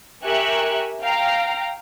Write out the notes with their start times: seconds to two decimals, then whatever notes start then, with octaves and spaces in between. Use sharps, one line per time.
0.24 G4 A#4 E5 G#5 C#6 F#6
1.01 F5 G5 A#5 F6